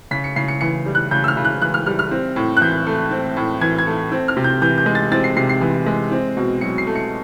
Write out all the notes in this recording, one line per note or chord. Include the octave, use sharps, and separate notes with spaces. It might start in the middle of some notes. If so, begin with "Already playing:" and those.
C#3 B6
C#7
C#3 C7
C#7
E3 C#7
G3
F#6
C#3 G6
E6
F6
C#3
F#6
E3 F#6
F6
G3 F6
F6
C4
A2
F#6
E3 G6
A3
C4
A2
E3 G#6
G#6
A3
C4
F6
C3
G6
E3 G6
G6
G#3
A6
C4 A6
C7
C3 C7
C7
E3
G#3
C4
B2
F#3 C#7
C7
A3
C#7